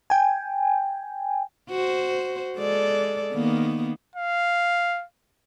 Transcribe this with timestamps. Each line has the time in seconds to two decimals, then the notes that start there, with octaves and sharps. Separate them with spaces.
0.10 G5 G#5
1.69 F#4 C5
2.57 G#3 A4 D5
3.34 D#3 A#3 B3
4.16 F5